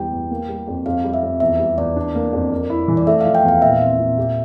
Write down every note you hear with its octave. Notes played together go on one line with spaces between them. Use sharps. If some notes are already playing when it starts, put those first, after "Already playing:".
Already playing: E2 G3 G5
E2
A#3
G3
F2
F2 F5
G3
E5
F2
E2 E5
G3
E2 D5
D4
A#3
F2
A#4
E4
E3
D5
A3 E5
F3 F5
G5
E2 F5
A#2 E5
C4
A#2
G4